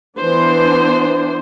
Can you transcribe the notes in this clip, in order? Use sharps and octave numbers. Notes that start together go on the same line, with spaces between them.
E3 B3 D4 C5